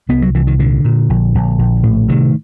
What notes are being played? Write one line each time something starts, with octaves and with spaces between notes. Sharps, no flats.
C2 B3
F#3
C2 E3
D#3
A#2 D3
A#2
A#1
A#1
A#1
A2
C3 D#3